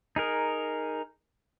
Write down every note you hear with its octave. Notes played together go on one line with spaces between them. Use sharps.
D#4 G#4 A#4